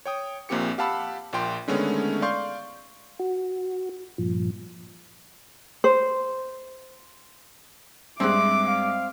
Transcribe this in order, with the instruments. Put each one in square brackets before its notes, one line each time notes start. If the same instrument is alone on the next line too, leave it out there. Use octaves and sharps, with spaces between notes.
[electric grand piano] C#5 G5 D#6
A#1 A#2 C4 G4 C#7
G4 F5 F#5 A5 B5 E6
A#1 A#2 G5 C6
D3 D#3 G#3 A3 B3 C#4
D5 F5 C6 C#6 G6
[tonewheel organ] F#4
G2 A#2 F3
[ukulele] C5
[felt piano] G2 G#3 F#6 [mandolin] C4 [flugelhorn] E5 [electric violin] D6
[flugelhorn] F5